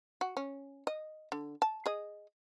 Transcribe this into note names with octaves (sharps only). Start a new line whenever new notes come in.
F#4
C#4
D#5
D3
A5
G#4 D#5